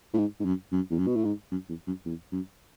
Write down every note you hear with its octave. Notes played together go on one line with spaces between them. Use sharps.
A2
G#2
G#2
F#2
F#2
E2
F#2
B2
A2
G#2
F#2
E2
F#2
E2
F#2